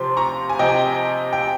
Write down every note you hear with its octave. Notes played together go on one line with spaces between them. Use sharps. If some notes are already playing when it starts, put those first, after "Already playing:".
Already playing: C3 F3 C4 C6
A#5 C#6
G#5
C3 F3 C4 D#5 G5
G5